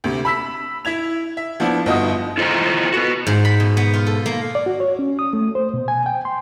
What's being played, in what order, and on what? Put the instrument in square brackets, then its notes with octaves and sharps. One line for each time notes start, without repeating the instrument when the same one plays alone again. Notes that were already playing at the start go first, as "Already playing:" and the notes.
[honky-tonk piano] D2 C3
B5 E6 B6
E4 E5 G#6 F7
E5
F3 B3 D4 E4
G1 B3 D#4 F4 F#4 D#6
[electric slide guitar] E4 F4 A4 C5 D#5 A#5
F#4 B4
[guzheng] G#2
B5
B2
B3
F4
A4
A#3
[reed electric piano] D5
F#4
C#5
C#4
D#6
A3
C5
B2
G#5
G5
C6